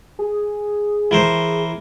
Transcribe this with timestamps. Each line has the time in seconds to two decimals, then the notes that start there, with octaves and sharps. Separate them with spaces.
0.19 G#4
1.11 E3 A#4 C5